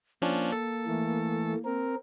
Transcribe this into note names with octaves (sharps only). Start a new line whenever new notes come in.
F3 A#3 C#4 D4
A4
E3 A3
C4 A#4